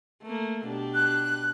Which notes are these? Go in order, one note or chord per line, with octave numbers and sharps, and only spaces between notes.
A3 A#3
B2 D4 G4
F#6